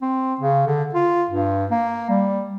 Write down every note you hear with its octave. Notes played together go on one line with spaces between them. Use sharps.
C4
C#3
D3
F4
G2
A#3
G3